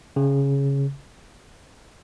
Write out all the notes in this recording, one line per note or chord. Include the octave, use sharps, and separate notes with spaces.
C#3